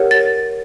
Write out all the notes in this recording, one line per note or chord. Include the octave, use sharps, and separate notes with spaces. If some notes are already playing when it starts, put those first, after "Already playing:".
Already playing: G4 A#4 C#5 F#5
A6